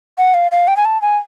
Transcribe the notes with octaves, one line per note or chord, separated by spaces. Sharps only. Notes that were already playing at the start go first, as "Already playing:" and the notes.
F#5
F5
F5
G5
G#5
A5
G#5